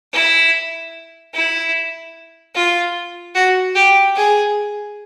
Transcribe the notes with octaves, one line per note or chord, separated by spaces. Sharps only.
E4
E4
F4
F#4
G4
G#4